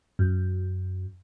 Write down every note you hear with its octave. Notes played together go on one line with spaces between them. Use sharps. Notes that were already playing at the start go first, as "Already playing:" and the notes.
F#2